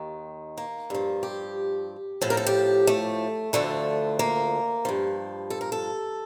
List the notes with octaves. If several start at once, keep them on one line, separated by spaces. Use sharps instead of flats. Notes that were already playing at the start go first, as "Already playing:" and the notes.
Already playing: D#2 D#3
A#3
G2 F3
G4
A2 F3 A4
A#4
A4
G4
A3
D2 D3 F3 A3
A#3
G2 F3
A4
A#4
A4